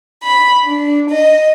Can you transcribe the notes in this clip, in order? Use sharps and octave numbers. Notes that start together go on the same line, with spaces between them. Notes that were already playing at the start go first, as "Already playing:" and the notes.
B5
D4
D#5